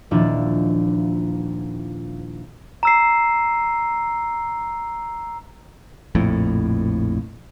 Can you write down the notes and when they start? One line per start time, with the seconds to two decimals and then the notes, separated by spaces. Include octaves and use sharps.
0.11 D#1 F3 D4 E4 A6
2.83 A#5 E6 C7
6.15 A#1 F2 A2